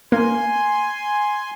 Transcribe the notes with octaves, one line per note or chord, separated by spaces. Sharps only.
A#3 G#5 C6